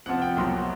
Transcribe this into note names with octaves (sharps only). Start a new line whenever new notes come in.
F2 C3 F3 F#5
G5
C2 B2 F#3 C6